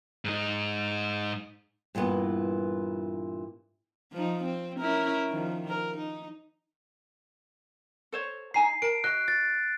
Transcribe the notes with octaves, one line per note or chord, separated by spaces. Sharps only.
G#2 D#4
G2 A#2 E3 B3
F3 D#4
C4
C#4 E4 A#4
D#3 F3
A#4
D#4
A4 C5 C#5
D#4 G#5 A#5 C7
A#4 A5 D7
F#4 D#5 F#6
A6